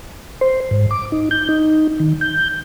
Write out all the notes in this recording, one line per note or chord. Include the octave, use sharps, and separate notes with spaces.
C5
G#2
D6
D#4
G6
D#4
D#3
G6